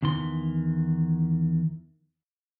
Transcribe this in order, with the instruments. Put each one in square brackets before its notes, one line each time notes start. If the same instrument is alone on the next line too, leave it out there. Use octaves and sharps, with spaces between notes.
[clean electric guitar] E2 D#3 E3 C6